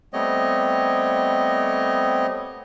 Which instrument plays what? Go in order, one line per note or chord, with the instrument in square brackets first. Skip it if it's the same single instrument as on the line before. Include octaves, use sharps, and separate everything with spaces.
[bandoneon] G3 A3 B3 C4 C#5 D#5